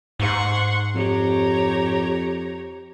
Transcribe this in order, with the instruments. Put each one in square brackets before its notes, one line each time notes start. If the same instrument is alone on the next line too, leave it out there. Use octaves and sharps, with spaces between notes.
[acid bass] G#2 [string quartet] F#5 C6 C#6
[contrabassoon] F2 [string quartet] G4 C#5 A#5